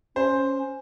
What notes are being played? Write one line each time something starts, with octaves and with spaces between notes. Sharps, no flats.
C#4 C5